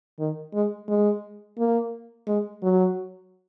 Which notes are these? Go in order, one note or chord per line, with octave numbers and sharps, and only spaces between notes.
D#3
G#3
G#3
A#3
G#3
F#3